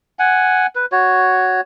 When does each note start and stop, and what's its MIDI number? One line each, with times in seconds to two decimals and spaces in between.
0.19 0.67 78
0.19 0.67 80
0.75 0.86 71
0.92 1.61 66
0.92 1.61 73